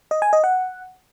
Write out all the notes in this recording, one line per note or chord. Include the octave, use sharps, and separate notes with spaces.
D#5
G#5
D#5
F#5